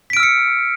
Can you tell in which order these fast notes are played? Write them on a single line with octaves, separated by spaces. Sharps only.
B6 D7 F6 E6 C#7